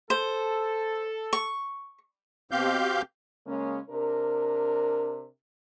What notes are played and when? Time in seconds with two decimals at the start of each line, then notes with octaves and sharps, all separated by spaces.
0.10 A4 C5
1.33 C#6
2.51 B2 C4 G4 F5 G6
3.47 C#3 G#3 A#3 C#4
3.90 C3 D4 A#4